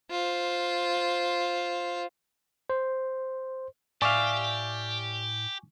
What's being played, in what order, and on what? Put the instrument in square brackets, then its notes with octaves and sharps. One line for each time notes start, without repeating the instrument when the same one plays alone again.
[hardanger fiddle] F4 C5
[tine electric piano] C5
[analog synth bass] A2 [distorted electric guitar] G4 [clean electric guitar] D5 E5 F5 [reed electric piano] G#5 C#6 D6